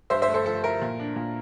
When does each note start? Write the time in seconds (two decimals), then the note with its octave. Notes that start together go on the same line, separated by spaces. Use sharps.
0.10 G2 C5 E5
0.22 C5 E5
0.28 A3
0.34 A4 C5
0.46 F3 A4
0.64 E4 A#4
0.82 A#2
1.00 D4
1.16 A#2